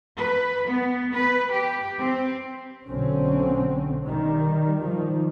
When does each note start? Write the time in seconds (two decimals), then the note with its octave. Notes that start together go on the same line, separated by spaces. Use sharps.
0.17 B4
0.67 B3
1.14 B4
1.51 G4
1.98 C4
2.86 B1 D3 C4 C#4
4.06 D#3 G3
4.80 D#3 F3 G3